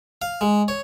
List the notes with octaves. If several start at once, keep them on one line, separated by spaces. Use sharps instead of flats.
F5
G#3
C#5